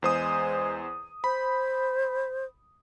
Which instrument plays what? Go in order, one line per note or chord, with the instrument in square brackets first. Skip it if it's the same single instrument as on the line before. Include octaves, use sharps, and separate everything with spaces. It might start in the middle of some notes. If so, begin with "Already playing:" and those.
[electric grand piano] E2 C5 D#6 [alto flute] G#3
[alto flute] C5 [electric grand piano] B5